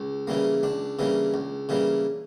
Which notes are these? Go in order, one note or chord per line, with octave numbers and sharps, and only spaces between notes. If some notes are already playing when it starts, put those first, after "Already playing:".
Already playing: C#2
C#3 E3 G3 A#3
C#2 D4
C#3 E3 G3 A#3
C#2
C#3 E3 G3 A#3